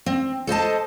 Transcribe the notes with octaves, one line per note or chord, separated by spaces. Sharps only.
C4
A4 C5 D#5 A5